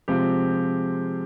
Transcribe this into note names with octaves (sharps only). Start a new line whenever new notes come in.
C3 F3 G#3 C4 G4